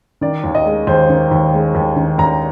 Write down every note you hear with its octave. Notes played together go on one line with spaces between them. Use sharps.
D#3 D5
D#2
D#5
G#3
D#2 C5
D#3
D#2
G#3
D#2
D#3
D#2 A#5